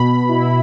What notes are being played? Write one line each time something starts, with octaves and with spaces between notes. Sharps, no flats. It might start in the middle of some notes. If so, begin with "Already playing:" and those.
Already playing: B2 B5
E4